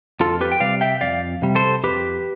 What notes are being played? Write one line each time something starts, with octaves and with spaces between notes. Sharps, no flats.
F2 F4 A4
G4 B4
G5
C3 G3 D5 F5
E5 G5
F2 D5 F5
C3 G3
A4 C5
F2 G4 B4